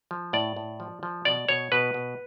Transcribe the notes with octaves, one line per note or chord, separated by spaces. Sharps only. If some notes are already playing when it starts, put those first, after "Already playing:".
F3
A2 D5
A2
F3
F3
B2 D5
B2 C#5
B2 B4
B2